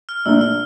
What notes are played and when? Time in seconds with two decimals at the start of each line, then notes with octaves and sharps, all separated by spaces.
0.09 F6
0.25 A#1 A#2 A3 D4 E6
0.41 F6